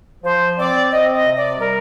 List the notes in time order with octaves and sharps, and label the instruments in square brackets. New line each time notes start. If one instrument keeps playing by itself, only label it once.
[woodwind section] F3 C5
C4 D5
C4 D#5
D#5
C3
D5
G3 A#4